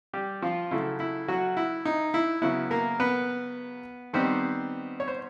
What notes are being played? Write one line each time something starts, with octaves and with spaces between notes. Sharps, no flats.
G3 G4
F3 F4
C#3 F#3 A3 E4
E4
F#3 F#4
E4
D#4
E4
C#3 F#3 B3 E4
A#3 A#4
B3 B4
D#3 G3 B3 C4 D#4 C5
C#5
C5